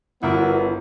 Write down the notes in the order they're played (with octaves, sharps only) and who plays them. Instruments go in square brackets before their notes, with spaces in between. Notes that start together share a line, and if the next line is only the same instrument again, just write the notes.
[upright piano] G1 [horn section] D3 B3 [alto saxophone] E4 [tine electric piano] F#4 A#4 F#5